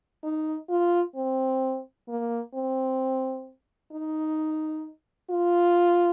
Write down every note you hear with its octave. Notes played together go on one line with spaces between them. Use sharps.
D#4
F4
C4
A#3
C4
D#4
F4